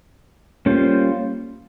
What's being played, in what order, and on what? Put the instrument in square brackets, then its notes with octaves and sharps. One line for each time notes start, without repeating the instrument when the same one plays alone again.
[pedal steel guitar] G3 A#3 C#4 F4 C5